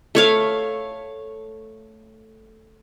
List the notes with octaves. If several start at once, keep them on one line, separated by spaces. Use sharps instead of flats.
A3 C#5 F5